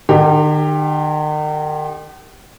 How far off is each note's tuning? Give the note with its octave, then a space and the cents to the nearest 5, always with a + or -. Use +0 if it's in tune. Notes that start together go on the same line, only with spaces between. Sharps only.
D#3 -40 G4 +15